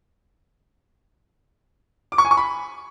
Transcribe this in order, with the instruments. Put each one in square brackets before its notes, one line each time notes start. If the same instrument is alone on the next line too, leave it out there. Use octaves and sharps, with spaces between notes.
[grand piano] D6
C#6
G#5
C#6
B5